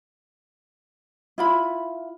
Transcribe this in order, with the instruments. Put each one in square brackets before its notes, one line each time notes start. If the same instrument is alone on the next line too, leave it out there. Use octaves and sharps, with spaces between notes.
[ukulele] E4 F4 B5